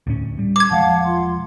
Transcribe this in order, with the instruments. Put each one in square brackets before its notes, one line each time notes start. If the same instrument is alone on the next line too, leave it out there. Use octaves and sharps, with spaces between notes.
[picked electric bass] D2 A2 C#4
G3
[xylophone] D6 G#6
[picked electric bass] E1 F3 G#3 [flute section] F5 F#5 A5
[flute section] F4 C6